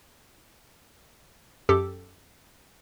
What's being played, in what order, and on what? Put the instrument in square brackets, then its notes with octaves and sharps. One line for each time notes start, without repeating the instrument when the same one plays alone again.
[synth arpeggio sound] F#2 G4 A4 D6